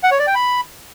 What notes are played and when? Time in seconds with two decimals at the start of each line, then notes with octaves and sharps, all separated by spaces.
0.03 F#5
0.11 C#5
0.19 D5
0.27 G5
0.35 B5